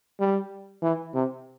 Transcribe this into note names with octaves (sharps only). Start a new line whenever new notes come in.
G3
E3
C3